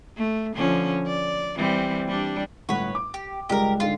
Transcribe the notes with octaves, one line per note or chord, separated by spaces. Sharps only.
A3
D3 F3 C#4
D5
E3 G3 C4
G3 D4
G1 A2 B4 C#5 F#5
D6
G4
C#2 G3 G#3 G4 A#4
G#2 D3 F4